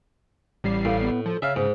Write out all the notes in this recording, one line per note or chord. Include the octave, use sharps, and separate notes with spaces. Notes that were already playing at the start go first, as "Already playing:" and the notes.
A1 G3 C7
A2 F5
B3
F3 A4
C#3 C#5 E5 F5
G#2 G#4